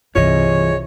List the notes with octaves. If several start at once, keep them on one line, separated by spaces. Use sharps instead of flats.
C2 G2 C3 E3 F4 G#4 C#5 D#5